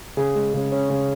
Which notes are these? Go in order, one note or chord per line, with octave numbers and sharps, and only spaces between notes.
C#3 G#4
G#3
C#3
C#4
C#3